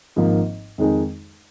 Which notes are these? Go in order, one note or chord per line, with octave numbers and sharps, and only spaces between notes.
G#1 G#2 F3 A#3
F2 D#3 G#3 D#4 G#4